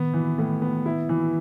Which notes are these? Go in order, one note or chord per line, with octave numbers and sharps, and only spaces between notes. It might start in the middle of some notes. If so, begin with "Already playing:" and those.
Already playing: D#3 B3
E3
A2
B3
E4
E3